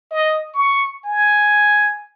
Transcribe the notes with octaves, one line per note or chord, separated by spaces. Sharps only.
D#5
C#6
G#5